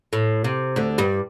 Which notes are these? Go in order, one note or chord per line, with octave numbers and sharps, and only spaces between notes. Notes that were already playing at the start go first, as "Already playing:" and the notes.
A2
C3
D2 D3
G2 G3